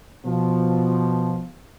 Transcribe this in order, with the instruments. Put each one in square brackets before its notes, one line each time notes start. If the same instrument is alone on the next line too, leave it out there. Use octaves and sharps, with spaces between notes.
[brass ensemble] B2 F3